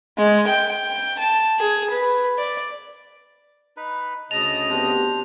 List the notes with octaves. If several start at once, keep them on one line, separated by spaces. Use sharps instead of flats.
G#3
G5
G5
A5
G#4
B4
D5
D#4 B4
D2 C#3 D#5 A5 F7
B3 C4 D4 G4 C5